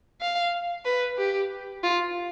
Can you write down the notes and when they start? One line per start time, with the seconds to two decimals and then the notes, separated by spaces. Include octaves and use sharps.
0.21 F5
0.85 B4
1.18 G4
1.84 F4